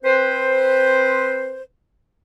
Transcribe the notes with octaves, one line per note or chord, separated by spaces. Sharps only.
C4 B4 C5